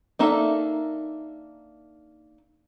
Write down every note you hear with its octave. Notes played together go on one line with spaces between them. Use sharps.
A#3 D4 D#4 A4 E5